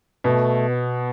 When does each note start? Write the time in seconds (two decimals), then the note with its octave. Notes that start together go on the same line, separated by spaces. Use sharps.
0.24 B2 A3
0.69 B3